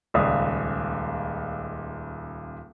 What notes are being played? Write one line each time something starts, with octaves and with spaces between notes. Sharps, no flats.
D#1 C#2 D5 E5 F5 D#6